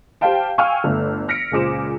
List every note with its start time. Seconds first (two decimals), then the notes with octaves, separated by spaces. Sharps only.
0.21 G4 C5 F5 G5 A5
0.58 F5 G5 G#5 C#6 E6 F6
0.84 G1 A3
1.28 F6 A#6 B6 C#7 D7
1.51 C#2 A#2 G#4 C5 D6 E7